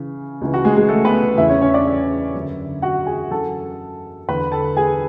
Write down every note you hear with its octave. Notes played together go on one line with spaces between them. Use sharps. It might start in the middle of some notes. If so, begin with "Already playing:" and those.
Already playing: C#3 E3
C#2 C#3 E3
F#4
G#3 G#4
G#3 G#4
A3 A4
B3 B4
E2 C#3 E3 E4 E5
C#4 C#5
C#4 C#5
D4 D5
E4 E5
F#2 D3
F#4 F#5
G#4 G#5
F#2 E3 A4 A5
E2 D3 B4 B5
A4 A5
G#4 G#5